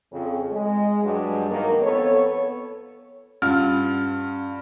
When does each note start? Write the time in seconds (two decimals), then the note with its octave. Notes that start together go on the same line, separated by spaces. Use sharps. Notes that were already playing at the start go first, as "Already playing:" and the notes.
0.12 F2 C#3
0.51 G#3
1.03 G2 F#3 G#3
1.49 D#3 A#3
1.82 F2 B3 A4 C#5
3.42 G2 C#4 F4 F6